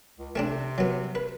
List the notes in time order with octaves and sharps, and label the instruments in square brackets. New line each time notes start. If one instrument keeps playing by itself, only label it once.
[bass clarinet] C#2
[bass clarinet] C3 [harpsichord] A3 C4 D4
[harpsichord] F#3 B3
B4